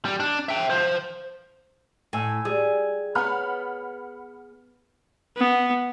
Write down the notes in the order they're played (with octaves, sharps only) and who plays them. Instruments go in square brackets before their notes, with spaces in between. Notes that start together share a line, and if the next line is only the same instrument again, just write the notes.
[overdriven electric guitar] G3
D4
E5 G5
F3 C5
[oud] A2 [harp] G#5 E6
[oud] G3 [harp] G#4
[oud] B3 C#5 [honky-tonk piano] F#5 B5 F6
[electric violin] B3